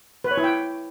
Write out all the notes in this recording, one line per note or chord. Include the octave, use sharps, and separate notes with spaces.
B4
C#5
E4
G5